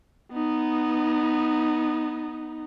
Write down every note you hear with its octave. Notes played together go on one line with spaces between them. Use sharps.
B3 D#4